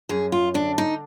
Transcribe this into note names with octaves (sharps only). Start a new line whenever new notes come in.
F#2 G#4
F4
D3 D4
D#4